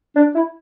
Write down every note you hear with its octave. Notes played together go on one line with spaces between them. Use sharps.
D4
E4